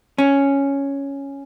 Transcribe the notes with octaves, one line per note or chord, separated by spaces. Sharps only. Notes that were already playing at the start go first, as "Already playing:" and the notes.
C#4